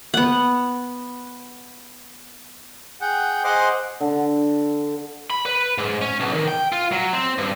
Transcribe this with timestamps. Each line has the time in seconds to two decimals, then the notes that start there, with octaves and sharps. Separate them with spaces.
0.14 B3 F#5
3.01 G#4 F#5 G5
3.44 G#4 C5 D#5 F#5 C6 D6
4.00 D3
5.30 B5
5.46 B4
5.78 G#2
6.02 C#4
6.20 B1
6.34 D#3
6.48 G5
6.72 F4
6.92 F#3
7.13 C4
7.38 G2